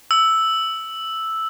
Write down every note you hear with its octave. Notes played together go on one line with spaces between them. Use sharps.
E6